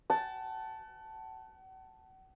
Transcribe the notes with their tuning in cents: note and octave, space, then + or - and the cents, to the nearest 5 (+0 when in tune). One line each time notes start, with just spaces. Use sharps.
F#5 +40 A5 +0